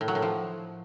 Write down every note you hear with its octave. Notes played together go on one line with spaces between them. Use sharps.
A2
F#3
A2
F3